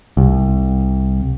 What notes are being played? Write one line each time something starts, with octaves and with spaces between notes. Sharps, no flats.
C2